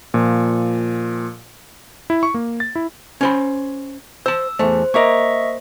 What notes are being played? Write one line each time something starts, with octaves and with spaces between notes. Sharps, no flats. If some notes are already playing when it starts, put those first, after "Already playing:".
A#2 F3
E4
C#6
A#3
A6
E4
C#4 C5 B5
C5 A5 E6
E2 A3 C5
A#3 A#4 D#5 E5 C#6